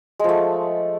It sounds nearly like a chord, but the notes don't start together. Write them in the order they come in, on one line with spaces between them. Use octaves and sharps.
G#3 F3 A3